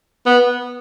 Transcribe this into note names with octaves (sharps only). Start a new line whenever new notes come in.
B3